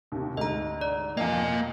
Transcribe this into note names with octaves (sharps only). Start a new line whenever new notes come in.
D#2 C3
D2 G#2 D#5 A#5
D5
F2 A#3 D#5 F5 G5 G#5